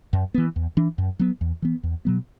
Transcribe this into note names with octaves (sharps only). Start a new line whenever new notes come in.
F#2
E3 B3
E2
E3 D4
F#2
F#3 B3
E2
E3 B3
E2
B2 F#3 B3